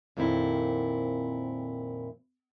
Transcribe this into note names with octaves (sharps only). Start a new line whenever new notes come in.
F2 A#2 D#3 C4 E4